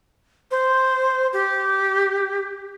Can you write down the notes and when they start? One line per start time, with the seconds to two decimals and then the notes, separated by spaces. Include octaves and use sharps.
0.51 C5
1.33 G4